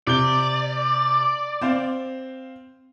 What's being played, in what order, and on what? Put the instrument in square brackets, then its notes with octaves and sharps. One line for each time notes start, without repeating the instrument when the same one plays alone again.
[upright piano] C3 G6 G7 [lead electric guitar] D5
[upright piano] C4 C5 F5